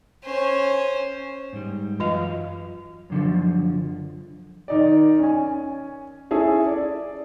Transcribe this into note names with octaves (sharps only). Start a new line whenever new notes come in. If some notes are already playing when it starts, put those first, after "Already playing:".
C#4 C5
G#2 G3
F#2 E3 F4 D#5 F5
F#2 D3 F3
D#3 D#4 D5
C#4 G#5
C#4 E4 G#4 A4
D5